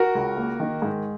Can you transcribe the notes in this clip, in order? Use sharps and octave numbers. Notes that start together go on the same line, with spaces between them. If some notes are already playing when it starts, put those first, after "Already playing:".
Already playing: F#4 A#4
C#2
A#3
D#3
G#2